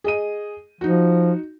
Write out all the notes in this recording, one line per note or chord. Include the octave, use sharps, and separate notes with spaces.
G#4 D#5 D#7
F3 D#4 F#4